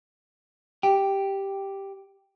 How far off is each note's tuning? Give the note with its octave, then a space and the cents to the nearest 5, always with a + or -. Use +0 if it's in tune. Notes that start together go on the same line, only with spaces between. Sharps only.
G4 +0 G5 +0